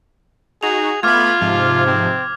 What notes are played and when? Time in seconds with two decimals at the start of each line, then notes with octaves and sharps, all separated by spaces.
0.63 D#4 F#4 G#4 F7
1.03 A3 B3 F4 B5 D6 F6 G#6
1.41 G#2 C3 F3
1.87 C4